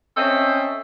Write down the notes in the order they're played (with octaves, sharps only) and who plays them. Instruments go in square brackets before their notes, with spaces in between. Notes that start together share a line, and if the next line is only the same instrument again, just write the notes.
[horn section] C4 C#4 A4 D#5 E5